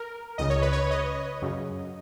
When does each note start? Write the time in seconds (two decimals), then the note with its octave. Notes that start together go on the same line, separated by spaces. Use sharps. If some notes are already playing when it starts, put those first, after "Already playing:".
Already playing: A#4
0.38 C#2 C#3 D#5
0.50 C#5
0.62 B4
0.72 C#5
0.91 D#5
1.42 F#2 C#3